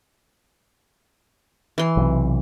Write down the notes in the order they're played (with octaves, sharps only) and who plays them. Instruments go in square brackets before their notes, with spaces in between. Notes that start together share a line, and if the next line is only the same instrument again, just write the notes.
[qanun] E3 C6
[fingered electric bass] B1 C3